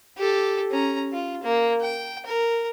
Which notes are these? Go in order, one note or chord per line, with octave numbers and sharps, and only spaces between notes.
G4 A4
C#4 A#5
F4
A#3
G5
A#4